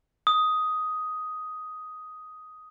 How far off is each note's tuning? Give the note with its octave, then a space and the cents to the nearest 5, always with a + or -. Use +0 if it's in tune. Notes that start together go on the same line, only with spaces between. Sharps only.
D#6 +5